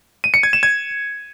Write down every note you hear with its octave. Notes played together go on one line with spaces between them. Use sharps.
D#7
C#7
G#6
E7
G#6